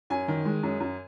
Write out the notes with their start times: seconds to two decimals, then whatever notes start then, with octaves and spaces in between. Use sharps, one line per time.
0.10 F#2 G#5
0.28 D#3
0.45 G#3
0.63 F#2
0.80 F#2